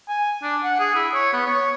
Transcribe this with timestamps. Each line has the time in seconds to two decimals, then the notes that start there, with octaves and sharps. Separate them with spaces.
0.09 G#5
0.42 D4
0.63 F#5
0.80 G#4
0.95 E4
1.14 C#5
1.33 B3
1.47 C#5